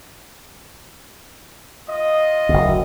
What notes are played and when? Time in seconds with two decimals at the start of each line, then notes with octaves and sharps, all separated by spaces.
1.89 F4 D#5
2.49 F#1 D2